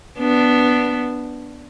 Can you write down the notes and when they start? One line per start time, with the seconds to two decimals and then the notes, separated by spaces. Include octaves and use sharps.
0.19 B3 D4